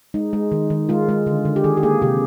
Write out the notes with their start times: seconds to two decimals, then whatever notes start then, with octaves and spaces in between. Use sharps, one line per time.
0.14 G#3 D#4
0.33 G#3
0.52 D#3
0.70 D#3
0.89 G#3 F4
1.09 G#3
1.27 D3
1.45 D3
1.56 G4
1.64 D#3 G#4
1.77 G4
1.83 A#3 G#4
2.02 C3 G4